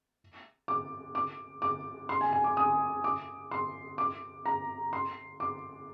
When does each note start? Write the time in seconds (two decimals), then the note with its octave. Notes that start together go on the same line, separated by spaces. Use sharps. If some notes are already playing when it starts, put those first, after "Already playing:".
0.68 D6
1.15 D6
1.62 D6
2.09 C6
2.21 G#5
2.33 G#5
2.44 D6
2.57 D#6
3.04 D6
3.51 C6
3.98 D6
4.46 A#5
4.93 C6
5.40 D6